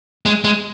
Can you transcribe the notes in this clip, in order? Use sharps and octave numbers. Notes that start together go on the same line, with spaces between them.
G#3
G#3